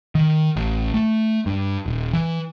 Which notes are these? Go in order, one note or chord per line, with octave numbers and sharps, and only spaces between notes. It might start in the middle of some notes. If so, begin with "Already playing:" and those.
D#3
A1
A3
G2
D#1
E3